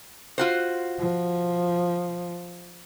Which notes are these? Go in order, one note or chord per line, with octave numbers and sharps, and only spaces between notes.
F4 F#4 C5
F3